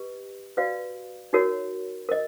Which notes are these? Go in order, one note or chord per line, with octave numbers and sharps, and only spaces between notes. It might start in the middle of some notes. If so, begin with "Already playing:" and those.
Already playing: G4 B4 D#5
F#4 B4 D5 F5
D#4 F#4 A#4 C#5
A#4 D#5